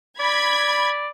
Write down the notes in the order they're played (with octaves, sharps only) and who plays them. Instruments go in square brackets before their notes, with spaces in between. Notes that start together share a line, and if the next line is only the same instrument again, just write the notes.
[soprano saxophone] D5 [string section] B5 G#6